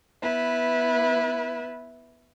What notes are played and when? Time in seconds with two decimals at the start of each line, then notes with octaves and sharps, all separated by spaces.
0.23 B3 E4 B4